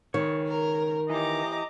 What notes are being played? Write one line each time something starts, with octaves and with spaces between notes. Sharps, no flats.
C#2 D#3 C#5
A#4
E3 G4 D#5 A#5 D6